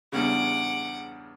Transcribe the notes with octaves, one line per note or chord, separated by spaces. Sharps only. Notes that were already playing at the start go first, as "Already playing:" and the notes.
E2 G2 C#3 F#5 D6